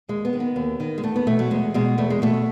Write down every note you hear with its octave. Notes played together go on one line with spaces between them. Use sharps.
D#2 G#3
B3
D#3
B3
D#2
D#3
G#3
E2 A3
B3
B2 A3
F#3
E2 G#3
B2 G#3
E2 A3
G#3
B2 A3